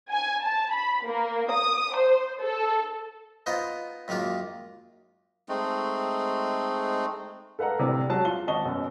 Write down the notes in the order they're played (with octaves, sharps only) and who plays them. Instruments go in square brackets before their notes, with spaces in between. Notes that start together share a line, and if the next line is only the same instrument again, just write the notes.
[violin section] G#5
A5
B5
A#3
D#6
C5
A4
[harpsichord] B3 D#4 F4 C5 D#5
F#2 D#3 G#3 A#3 F4
[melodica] G#3 A3 C4 D#4
[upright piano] A4 B4 F5 F#5 A#5
A2 C3 G3 D4
F#3 G#3 A5
F4 G7
G#1 D#5 A5 C#6 G7
F#2 B2